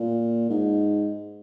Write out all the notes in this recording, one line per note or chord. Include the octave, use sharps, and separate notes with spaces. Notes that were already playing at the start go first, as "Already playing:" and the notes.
Already playing: A#2
G#2